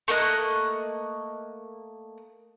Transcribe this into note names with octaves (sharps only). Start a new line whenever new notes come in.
A3 A#3 D#5 F#6